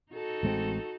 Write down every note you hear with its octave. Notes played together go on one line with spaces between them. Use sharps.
D#4 F#4 A4
A1 G#3 C4